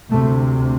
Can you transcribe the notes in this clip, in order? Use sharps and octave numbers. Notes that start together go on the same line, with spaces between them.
D2 C3 A3